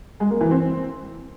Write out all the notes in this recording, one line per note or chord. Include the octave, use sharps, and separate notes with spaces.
G#3
A#3
E3
C4